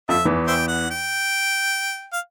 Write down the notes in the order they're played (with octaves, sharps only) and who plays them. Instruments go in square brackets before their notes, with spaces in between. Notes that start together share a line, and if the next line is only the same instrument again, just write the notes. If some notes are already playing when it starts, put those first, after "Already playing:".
[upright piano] F2 F3 [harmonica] E5
[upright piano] E2 E3
[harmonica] C5 E5 G5
F#5
G5
F5